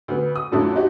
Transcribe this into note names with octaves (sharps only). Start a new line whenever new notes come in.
D2 B3
D#6
F#2 A#2 A3 D4 E4 F#4
D#4 F#4 G4